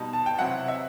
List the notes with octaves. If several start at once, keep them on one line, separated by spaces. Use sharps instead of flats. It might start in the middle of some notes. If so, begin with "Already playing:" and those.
Already playing: B2 G3 D#4 A5
A5
G5
C3 F#3 C4 E4 F#5
E5